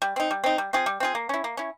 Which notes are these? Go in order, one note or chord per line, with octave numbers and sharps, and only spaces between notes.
G3
C4 D#4
G3
C4 D#4
G3
C4 F4 G#4
G3
C4 F4 G#4
A#3
C#4 E4
A#3
C#4 E4